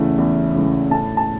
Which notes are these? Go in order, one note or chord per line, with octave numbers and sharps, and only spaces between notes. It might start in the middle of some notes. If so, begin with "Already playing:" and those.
Already playing: E2 C#3 E3 A3
E2
C#3 E3 A3
A2 A5
A5